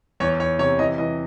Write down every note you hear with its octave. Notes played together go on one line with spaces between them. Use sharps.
E2 C#5
E2 C#5
C3 C#5
E3 D#5
E3 D#5